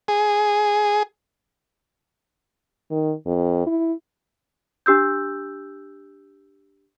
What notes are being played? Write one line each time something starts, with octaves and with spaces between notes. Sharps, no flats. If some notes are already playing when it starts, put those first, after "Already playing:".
G#4
D#3
F2
E4
D4 G4 E6 G6